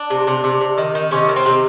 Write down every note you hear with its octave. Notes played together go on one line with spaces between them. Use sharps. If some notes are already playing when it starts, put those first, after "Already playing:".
Already playing: D4
C3
C3
C3
C3
D#3
D#3
C3 C#4
D#3
C4
C3